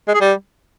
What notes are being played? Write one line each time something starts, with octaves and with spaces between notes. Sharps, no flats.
G#3
G#4
G3